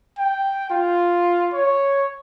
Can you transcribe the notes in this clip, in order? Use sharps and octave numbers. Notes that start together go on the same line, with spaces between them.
G5
F4
C#5